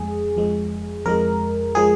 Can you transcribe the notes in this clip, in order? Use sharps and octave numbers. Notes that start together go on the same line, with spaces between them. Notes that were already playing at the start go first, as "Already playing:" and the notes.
Already playing: F2 F3 G#3 G#4
F2 F3 G#3
F2 F3 G#3 A#4
F3 G#3 G#4